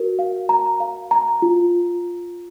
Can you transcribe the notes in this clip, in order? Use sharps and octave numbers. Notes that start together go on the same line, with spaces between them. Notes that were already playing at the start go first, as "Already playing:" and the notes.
Already playing: F#4 A#4
F5
A#5
F5
A#5
F4